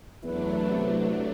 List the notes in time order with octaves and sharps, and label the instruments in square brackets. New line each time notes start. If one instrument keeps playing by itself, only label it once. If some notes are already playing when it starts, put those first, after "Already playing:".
[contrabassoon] E2 [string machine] F#3 A3 D4 [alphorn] E4 [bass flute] B4
[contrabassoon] C3